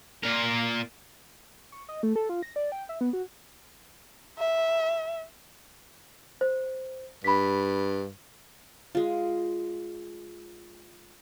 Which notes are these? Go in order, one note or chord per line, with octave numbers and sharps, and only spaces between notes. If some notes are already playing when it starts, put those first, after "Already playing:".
A#2 A#4
C#6
D#5
A3
A4
F4
A#6
D5
G5
E5
B3
F#4
E5
C5
G2 B5 B6
G#3 F4